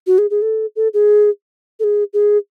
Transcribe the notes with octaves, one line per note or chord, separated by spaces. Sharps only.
F#4
G#4
G#4
A4
A4
G#4
A4
G#4
G#4